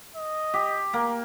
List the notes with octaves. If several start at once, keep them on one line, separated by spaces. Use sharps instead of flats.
D#5
G4
A#3